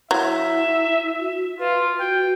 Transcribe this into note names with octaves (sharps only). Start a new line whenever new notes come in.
F#3 E4 E5
F#4
F4 B4
F#4 G5